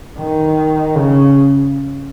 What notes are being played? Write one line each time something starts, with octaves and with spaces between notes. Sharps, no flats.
D#3
C#3